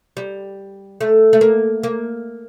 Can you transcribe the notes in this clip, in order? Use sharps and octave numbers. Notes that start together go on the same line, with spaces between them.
G3
A3
A3
A#3
A#3